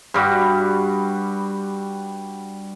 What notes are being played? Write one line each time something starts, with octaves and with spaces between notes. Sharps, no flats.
G2 G3 F#4